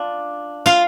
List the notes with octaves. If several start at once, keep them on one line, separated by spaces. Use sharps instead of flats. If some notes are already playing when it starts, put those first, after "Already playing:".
Already playing: D4 F4
F4 F5